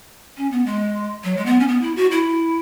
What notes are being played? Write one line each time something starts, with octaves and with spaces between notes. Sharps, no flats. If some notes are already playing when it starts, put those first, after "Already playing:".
C#4
B3
G#3
F#3
G#3
B3
C#4
B3
E4
F#4
E4